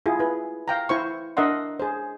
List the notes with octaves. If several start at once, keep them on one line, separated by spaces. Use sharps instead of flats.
E4 F4 G#4
E4 B4
F5 G5 A#5
E4 C5 C#6
D4 A#4 D#5 E5 F#5 C6
G#4 C5